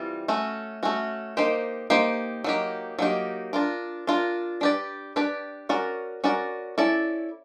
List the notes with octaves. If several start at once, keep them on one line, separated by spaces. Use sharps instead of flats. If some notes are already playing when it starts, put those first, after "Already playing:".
Already playing: E3 G3 C4 F4
A3 C#4 F#4
A3 C#4 F#4
A#3 D#4 G4 C5
A#3 D#4 G4 C5
F#3 A#3 D#4 G4
F#3 A#3 D#4 G4
D4 F4 A#4
D4 F4 A#4
D4 G4 B4 D5
D4 G4 B4 D5
C#4 F#4 A#4 D5
C#4 F#4 A#4 D5
C#4 E4 A4 D5